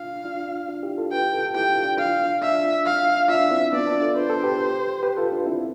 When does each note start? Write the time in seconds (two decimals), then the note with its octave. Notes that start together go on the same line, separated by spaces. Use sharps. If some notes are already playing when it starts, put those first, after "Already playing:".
Already playing: D4 F4 F5
0.25 D4 F4
0.68 D4 F4
0.83 E4 G4
0.98 F4 A4
1.12 G4 B4 G5
1.34 F4 A4
1.46 A4
1.55 E4 G4 G5
1.70 D4 F4
1.84 D4 F4
1.99 F5
2.42 D4 F4 E5
2.86 F5
3.29 D4 F4 E5
3.51 C4 E4
3.73 B3 D4 D5
3.87 D4 F4
4.01 F4 A4
4.16 B4 C5
4.30 A4
4.43 G4 B4
5.03 G4 B4
5.17 F4 A4
5.32 D4 F4
5.46 C4 E4